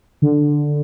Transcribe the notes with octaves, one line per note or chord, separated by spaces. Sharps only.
D3